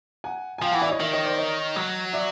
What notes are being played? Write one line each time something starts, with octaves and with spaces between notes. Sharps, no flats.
F#5 G#5
G#5
F3 F5 G5
F#5 G#5
E3
D5 E5
C#5 D#5
D#3 E5
C#5 D#5
C5 D5
C#5 D#5
F#3
D5 E5